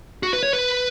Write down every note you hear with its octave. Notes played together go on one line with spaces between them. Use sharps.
F#4
B4
C#5
B4